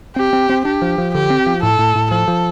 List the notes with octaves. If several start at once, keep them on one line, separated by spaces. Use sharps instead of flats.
C4 G4
C4
C4
D4 G4
F3
F3
D3 G4
C4
F3
A2 A4
A2
A2
F3 A4
F3